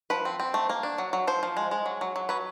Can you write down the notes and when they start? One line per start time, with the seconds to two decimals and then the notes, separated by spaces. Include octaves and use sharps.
0.10 F3 B4
0.25 C4
0.40 C4
0.54 A3
0.69 A#3
0.83 D4
0.98 F#3
1.13 F#3
1.27 F3 C5
1.43 F3
1.57 G#3
1.71 G#3
1.86 F#3
2.01 F#3
2.16 F#3
2.29 F#3 B4